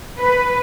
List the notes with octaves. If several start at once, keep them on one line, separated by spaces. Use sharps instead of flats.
B4